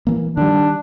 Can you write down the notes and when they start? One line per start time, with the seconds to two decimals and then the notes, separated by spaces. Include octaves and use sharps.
0.07 E3 A#3
0.37 D#3 G3 D4